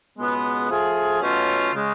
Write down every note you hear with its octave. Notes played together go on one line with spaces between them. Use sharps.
C#2 B2 G#3 B3
F3 A3 F4 G#4
B2 F#3 A3 C#4 F4
C#3 G#3